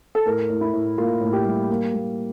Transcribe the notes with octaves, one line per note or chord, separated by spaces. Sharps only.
A4
A2 A#4
A2
E4
A2
A#3 F4
A2
G4
G3
A#3
A#3